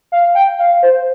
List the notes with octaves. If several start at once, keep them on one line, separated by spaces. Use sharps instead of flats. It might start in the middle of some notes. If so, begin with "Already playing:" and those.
F5
G5
F5
C5